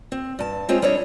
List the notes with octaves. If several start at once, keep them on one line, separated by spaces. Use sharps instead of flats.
C4
G2 A5
G#3 C4 F4 G#4 C5 C#5
G3 D4 A4 C#5 D#5